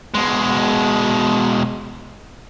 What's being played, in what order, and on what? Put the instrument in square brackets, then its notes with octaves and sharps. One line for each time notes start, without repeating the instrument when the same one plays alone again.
[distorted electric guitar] B2 G#3